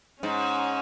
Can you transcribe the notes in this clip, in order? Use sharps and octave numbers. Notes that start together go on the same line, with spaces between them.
G#2 C#4